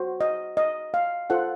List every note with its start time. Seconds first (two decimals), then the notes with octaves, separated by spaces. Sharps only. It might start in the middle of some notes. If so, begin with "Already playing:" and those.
Already playing: F#4 C5
0.21 D#5
0.57 D#5
0.94 F5
1.30 F4 A4 C5 F#5